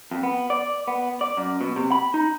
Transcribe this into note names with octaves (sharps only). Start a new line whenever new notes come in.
F2
B3
D5
B3
D5
F#2
B2
C3
B5
D#4